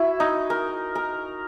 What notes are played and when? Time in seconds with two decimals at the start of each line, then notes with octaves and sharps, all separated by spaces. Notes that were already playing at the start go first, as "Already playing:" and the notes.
Already playing: E4 F#4
0.20 D#4
0.50 A#4
0.95 A#4